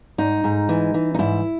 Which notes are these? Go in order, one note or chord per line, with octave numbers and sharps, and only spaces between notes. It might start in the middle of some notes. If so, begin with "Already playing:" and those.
G#2 D#4
G#2
E3
E3
D#4
G#2 E4